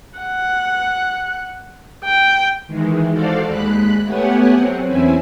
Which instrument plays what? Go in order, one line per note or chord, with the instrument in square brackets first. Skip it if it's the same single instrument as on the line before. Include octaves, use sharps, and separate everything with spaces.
[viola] F#5
G5
[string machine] D#3 E3 G#3
F#4 A4 C5 D5 F5
D#2 G#3 B5 F#6
A3 B3 G4 C#5 F#5 G#5
F#3 C4
E2 C4 C#4 E4 E5 G#5